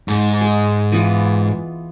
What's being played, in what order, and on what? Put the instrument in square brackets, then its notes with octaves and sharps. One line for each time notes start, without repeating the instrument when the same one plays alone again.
[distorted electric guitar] G#2
[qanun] G#3
E3 B3 F4